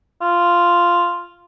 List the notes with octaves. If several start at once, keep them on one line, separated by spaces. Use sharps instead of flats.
F4